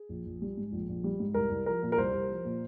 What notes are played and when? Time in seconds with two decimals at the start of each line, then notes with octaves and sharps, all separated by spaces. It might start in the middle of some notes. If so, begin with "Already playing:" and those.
Already playing: G#4
0.09 A#1
0.26 A#1
0.42 G3
0.57 G#2
0.72 A#1
0.89 A#1
1.04 G3
1.20 G#2
1.34 C2 A#4
1.50 C2
1.66 F3 A#4
1.83 A#2
1.92 A#4
1.97 C2 C5
2.14 C2
2.30 F3
2.45 A#2